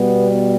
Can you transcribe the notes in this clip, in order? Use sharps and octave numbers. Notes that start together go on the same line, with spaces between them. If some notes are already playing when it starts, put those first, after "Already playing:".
Already playing: B2 G3 B3